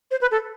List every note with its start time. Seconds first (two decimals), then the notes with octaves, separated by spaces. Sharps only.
0.11 C5
0.21 B4
0.31 A4